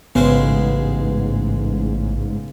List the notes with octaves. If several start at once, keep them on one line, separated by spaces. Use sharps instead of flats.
A1 G#2 C#3 G#3 B3 C5